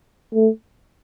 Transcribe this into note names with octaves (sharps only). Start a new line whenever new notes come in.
A3